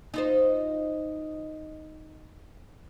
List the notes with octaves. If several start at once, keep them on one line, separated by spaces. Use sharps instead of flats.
D#4 F4 C5